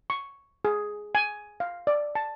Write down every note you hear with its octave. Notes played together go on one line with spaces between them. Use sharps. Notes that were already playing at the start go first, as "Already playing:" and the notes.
C#6
G#4
G#5
F5
D5
A5